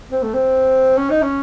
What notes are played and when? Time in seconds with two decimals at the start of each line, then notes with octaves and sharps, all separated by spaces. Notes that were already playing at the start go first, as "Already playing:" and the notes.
0.11 C4
0.23 A3
0.34 C4
0.97 C#4
1.10 D#4
1.22 C#4